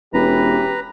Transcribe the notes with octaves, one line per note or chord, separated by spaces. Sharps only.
E1 E3 C#4 G4 B4 A#5